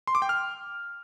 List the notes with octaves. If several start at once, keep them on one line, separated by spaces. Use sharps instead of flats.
C6
D6
G5
F6